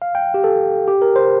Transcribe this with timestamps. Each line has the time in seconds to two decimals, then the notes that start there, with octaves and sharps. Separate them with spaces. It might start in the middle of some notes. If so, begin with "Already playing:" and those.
0.02 F5
0.15 G5
0.34 G4
0.44 A4
0.88 G4
1.02 A#4
1.16 C5